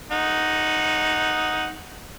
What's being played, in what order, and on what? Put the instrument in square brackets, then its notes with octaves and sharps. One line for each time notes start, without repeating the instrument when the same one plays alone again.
[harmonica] D#4 F#5